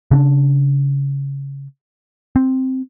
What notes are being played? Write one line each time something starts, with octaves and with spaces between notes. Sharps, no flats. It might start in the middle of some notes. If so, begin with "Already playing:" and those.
C#3 C#4 D4
C4